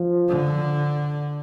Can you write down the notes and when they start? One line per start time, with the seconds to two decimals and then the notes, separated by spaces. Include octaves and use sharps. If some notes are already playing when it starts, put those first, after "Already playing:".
Already playing: F3
0.29 D3